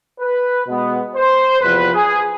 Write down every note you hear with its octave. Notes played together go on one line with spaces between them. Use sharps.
B4
B2 G#3 B3
C5
E2 C3 F3 B4
G#4